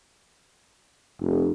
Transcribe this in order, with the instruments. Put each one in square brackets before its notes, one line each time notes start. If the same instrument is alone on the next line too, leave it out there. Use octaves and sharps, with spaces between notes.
[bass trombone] F1